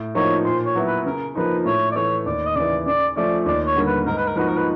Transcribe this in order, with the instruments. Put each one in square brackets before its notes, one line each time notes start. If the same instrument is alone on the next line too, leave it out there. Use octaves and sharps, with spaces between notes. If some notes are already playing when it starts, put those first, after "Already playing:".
Already playing: [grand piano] A2
[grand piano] F3 A#3 D#4 F#4 [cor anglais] C#5
[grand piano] A#2 [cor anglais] C5
[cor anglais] C#5
[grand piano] F#3 B3 E4
[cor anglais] B4
[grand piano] C#3 [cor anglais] A#4
[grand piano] F3 A#3 D#4 [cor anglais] B4
[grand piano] A2 [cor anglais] C#5
[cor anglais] D5
[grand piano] E3 A3 [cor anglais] C#5
[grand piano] D#2 [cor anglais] D5
[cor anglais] D#5
[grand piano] C#3 E3 [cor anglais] D5
[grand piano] C#3 [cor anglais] D5
[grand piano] F3 A3 C#4 [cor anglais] D5
[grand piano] D#2 [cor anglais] D5
[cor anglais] C#5
[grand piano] D3 G3 A#3
[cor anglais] B4
[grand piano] G#2 [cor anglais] A#4
[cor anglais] B4
A#4
[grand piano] F3 A#3 D#4 F#4 [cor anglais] B4
[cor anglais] A#4
B4